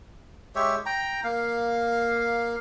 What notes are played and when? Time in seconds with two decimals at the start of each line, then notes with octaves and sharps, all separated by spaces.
0.56 G#3 G4 C#5 E5
0.86 G5 A#5
1.24 A#3 F5